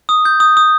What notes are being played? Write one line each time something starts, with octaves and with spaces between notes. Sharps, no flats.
D#6
G6
D#6
D#6